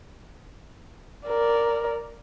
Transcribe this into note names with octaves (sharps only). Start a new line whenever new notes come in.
A#4 D5